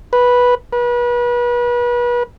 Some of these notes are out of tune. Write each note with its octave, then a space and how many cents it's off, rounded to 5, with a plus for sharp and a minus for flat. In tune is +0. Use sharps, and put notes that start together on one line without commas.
B4 -10
B4 -35